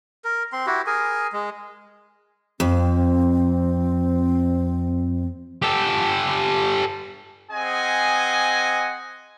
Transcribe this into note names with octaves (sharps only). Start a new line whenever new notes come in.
A#4
C4 C6
E4 F#4 G4
G#4 A#4 G#5
G#3
F2 C4
G4 A4
C4 G#4 D#5 F#5 G#5